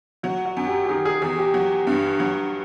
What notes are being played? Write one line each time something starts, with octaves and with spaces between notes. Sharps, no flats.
F#3 F#4
F#4
F#2
G4
G4
D#3 G#4
G#4
E2 G#4
G4
F#3
G2
F#3